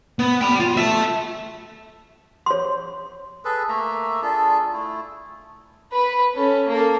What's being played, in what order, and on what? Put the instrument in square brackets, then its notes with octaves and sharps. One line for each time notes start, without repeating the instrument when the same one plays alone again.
[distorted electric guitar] B3
G5 B5
F4
E5 A5
[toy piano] C#5 C6
[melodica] G#4 A4 B4
A3 A#3 E5 A#5
D4 F4 G#4 A4
A3 E4
[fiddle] B4 B5
C#4 A4
A#3 A4